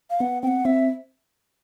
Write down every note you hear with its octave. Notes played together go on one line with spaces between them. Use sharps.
F5
B3 F#5
C4 F#5 G5
C4 E5